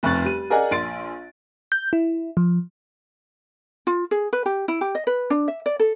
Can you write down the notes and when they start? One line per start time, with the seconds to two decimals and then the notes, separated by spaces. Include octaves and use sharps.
0.03 F1 F2 C#6 F#6 A6
0.25 G3 D#7
0.50 G#4 A#4 D5 D#5 F#5 G#5
0.71 A#1 C6 A6 D7
1.72 G6
1.93 E4
2.37 F3
3.87 F4
4.11 G#4
4.33 B4
4.46 G4
4.68 E4
4.81 G4
4.95 D#5
5.07 B4
5.30 D4
5.48 E5
5.66 D5
5.80 A4